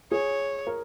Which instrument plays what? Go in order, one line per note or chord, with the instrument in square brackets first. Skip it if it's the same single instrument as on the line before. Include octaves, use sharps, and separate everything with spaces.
[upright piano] G#4 [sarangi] C#5
[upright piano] A#4